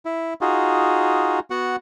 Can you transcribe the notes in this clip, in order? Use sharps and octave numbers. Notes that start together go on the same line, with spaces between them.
E4
D#4 F4 F#4 G#4
B3 F#4 F#5